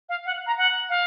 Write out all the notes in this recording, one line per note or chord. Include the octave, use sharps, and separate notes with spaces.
F5
F#5
A#5
F#5
F5